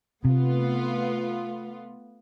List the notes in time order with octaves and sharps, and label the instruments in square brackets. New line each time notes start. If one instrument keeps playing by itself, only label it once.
[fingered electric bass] C3 [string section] A3 B3 F4